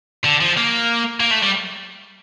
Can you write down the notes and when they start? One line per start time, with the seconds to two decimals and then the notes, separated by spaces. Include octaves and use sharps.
0.25 D3
0.41 F3
0.57 A#3
1.20 A#3
1.31 A3
1.42 G3